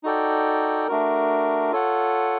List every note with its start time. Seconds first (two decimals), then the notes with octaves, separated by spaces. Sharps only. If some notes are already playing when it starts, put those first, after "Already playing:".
0.03 D#4 F#4 A4 D5 G5
0.88 A3 D4 F#4 A#4
1.72 F4 A4 C#5 F#5